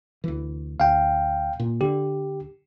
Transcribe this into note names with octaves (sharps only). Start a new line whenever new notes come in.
D2 E3
D2 F5 G5
A#2
D3 G4